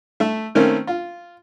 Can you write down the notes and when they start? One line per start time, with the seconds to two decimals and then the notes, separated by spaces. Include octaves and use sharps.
0.20 A3 E5
0.55 D#3 A3 A#3 C4 C#4
0.87 F4